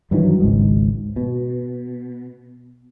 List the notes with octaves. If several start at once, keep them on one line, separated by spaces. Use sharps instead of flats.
G2 D#3 E3 F#3
G#1 C#2 G#2
B2